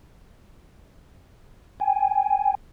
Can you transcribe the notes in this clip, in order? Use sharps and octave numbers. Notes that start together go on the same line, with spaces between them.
G5 G#5